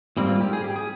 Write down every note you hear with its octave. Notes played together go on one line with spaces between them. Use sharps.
G#2 G3 A#3 C4
F4
G4
G#4
G4
G#4